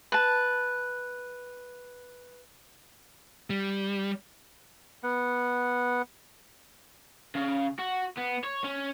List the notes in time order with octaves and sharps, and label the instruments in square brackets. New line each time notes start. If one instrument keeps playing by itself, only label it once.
[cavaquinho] B4 A5
[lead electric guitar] G3
[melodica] B3 F#5
[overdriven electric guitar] C#3
F#4
B3
C#5
C#4